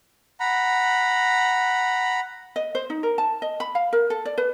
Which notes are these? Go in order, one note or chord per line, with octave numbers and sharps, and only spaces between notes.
F#5 A#5 B5
D#5
C5
D#4
A#4
A5
D#5
B5
F5
A#4
A4
D5
B4